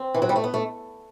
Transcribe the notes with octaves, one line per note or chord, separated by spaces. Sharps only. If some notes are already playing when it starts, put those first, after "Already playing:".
Already playing: C4
E3
F#3
G3
A3
B3
A3